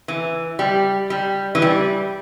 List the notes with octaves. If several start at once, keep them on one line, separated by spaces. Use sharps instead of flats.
E3
G3
G3
E3
G3